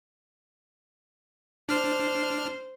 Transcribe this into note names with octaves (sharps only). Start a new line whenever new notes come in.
D4 C5 F6